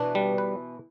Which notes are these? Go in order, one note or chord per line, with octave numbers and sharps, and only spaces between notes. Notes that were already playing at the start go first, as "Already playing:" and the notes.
Already playing: B2 E3 D4
G3
B4